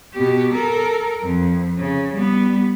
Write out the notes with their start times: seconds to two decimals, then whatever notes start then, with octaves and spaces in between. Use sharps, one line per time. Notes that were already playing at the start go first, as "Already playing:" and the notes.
0.14 B2 G4
0.54 A4 A#4
1.23 F2
1.78 C#3
2.14 G3 B3